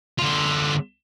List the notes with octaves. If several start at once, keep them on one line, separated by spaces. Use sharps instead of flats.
D3 F4